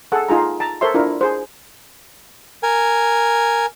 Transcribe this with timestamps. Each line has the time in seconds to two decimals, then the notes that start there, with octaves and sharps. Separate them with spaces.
0.12 G#4 A4 F#5
0.29 D#4 F4 G#4 A#5
0.60 A5 A#5
0.81 A4 A#4 C5 C#5 E5 C6
0.94 D4 E4 F4 A#4
1.21 G#4 C5
2.63 A#4 G#5